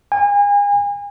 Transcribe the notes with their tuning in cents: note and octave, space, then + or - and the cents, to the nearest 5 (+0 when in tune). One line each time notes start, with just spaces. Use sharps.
G#5 -35